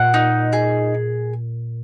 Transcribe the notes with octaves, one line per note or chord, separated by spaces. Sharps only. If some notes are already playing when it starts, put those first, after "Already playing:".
Already playing: A#2 F#5
D#4
G#4